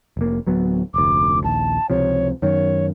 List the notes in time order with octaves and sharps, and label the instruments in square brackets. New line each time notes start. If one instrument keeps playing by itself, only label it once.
[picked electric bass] F1 A#3
D1 F#3 B3
[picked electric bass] F1 D2 [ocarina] D6
[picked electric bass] A#1 D#2 [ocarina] A5
[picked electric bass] C#2 C3 F3 [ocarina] C#5
[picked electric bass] F#2 D#3 [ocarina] C#5